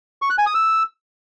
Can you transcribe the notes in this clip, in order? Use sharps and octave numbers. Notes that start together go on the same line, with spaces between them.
C#6
F#6
G#5
D#6
E6